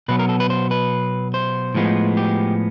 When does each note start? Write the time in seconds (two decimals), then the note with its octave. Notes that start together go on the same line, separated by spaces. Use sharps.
0.08 B2 F#3 B3 B4
0.19 A#4
0.29 A4
0.40 B4
0.50 C5
0.71 B4
1.34 C5
1.75 A2 F3 G#3 B3
2.17 G4